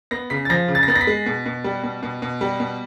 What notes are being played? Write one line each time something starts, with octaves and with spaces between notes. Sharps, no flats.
B3 A#6
C#3 B6
A6
F3 A#6
C#3
A6
A#6
B3 A6
A#6
B6
G#3
B2
B2
G3
B2
B2
B2
G3
B2